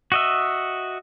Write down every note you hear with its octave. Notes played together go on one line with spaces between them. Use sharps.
F#4 D#5 E5